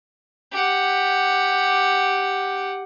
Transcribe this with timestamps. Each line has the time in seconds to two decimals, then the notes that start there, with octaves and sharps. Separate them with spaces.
0.52 G4 F#5